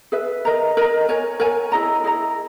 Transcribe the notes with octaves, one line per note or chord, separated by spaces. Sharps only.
G#4 B4 E5
A#4 D#5 A#5
A#4 D#5 A#5
A#4 C#5 G#5
A#4 C#5 G#5
E4 G#4 D#5 A#5
E4 G#4 D#5 A#5